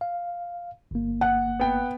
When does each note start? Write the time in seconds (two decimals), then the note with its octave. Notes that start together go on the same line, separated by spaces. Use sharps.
0.01 F5
0.91 G1 A#3
1.21 F#5
1.60 B3 G5